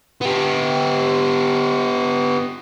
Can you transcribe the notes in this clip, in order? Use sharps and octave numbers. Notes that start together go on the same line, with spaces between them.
B3 G4